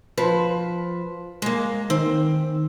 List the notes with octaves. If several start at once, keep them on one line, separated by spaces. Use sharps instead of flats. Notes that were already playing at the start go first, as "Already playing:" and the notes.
F3 B4 C5
G#3 A#3
D#3 C4